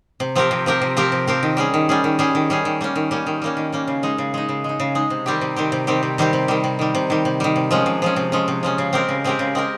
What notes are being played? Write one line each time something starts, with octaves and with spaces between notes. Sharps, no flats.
C3
F3 C4 G4 A#4
C3
F3 C4 G4 A#4
C3
F3 C4 G4 A#4
C3
F3 C4 G4 A#4
D#3
G3 C#4 G#4
D#3
G3 C#4 G#4
D#3
G3 C#4 G#4
D#3
G3 C#4 G#4
D#3
G3 A#3 C#4
D#3
G3 A#3 C#4
D#3
G3 A#3 C#4
D#3
G3 A#3 C#4
C#3
G#3 D#4
C#3
G#3 D#4
C#3
G#3 D#4
C#3
G#3 D#4
C3
D#3 G3 C4 G4
C3
D#3 G3 C4 G4
C3
D#3 G3 C4 G4
C3
D#3 G3 C4 G4
C3
D#3 G3
C3
D#3 G3
C3
D#3 G3
C3
D#3 G3
C3
F3 G#3 C#4
C3
F3 G#3 C#4
C3
F3 G#3 C#4
C3
F3 G#3 C#4
C#3
G#3 C4 G4 A#4
C#3
G#3 C4 G4 A#4
C#3
G#3 C4 G4 A#4